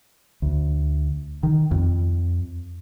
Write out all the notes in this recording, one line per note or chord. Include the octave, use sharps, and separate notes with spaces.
D2
D#3
F2